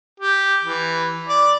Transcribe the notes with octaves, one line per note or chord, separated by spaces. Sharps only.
G4
E3
D5